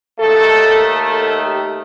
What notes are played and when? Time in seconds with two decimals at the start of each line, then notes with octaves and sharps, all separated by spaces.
0.19 D#2 D#3 A3 A4
1.09 A4
1.40 G4